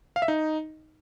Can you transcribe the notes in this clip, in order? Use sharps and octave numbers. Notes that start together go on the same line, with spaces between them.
F5
E5
D#4